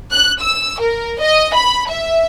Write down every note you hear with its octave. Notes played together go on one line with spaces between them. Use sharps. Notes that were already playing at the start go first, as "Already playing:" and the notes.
F#6
E6
A#4
D#5
B5
E5